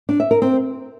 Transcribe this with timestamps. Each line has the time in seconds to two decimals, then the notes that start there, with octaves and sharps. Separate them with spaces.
0.09 D4
0.20 E5
0.31 A#4
0.42 C4